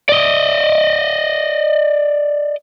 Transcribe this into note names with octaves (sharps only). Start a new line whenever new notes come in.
D5 D#5